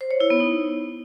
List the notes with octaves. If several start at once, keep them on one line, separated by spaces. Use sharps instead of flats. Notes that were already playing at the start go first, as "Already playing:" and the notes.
C5
C#5
E4
B3
D#4